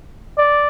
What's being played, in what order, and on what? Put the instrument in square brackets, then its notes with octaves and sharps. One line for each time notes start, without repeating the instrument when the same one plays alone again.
[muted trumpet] D5